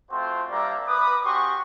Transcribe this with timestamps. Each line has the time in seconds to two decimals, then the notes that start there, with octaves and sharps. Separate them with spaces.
0.11 A3 C4 F4 F#4 C5
0.50 G3 A#3 D4 D5 E5 A#5
0.87 B4 D6 D#6
1.25 C#4 F#4 G4 C6 C#6